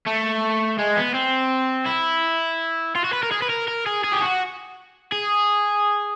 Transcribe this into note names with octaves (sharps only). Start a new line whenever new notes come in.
A3
G#3
B3
C4
E4
F4
F#4
B4
A#4
G#4
B4
A#4
A#4
G#4
G#4
G4
F#4
G#4